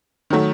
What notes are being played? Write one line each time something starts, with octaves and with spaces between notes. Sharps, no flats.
D#3 F#3 A3